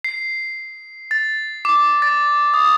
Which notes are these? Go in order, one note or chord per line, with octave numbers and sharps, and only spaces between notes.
C7
A6
D6
A6
D#6